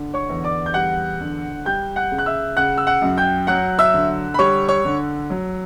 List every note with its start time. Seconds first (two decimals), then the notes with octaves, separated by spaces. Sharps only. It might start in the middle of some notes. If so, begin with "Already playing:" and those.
Already playing: D3
0.14 C#5 C#6
0.30 E2
0.44 D5 D6
0.66 G6
0.74 G3 F#5 F#6
1.21 D3
1.65 G3 G5 G6
1.96 F#5 F#6
2.11 C#3
2.18 F#6
2.26 E5 E6
2.57 C#3 F#5 F#6
2.78 E6
2.87 F#5 F#6
3.02 F#2
3.18 G5 G6
3.47 F#3 F#5 F#6
3.79 E5 E6
3.94 D3
4.34 B5
4.39 G3 C#5 C#6
4.68 C#5 C#6
4.85 D3
5.30 F#3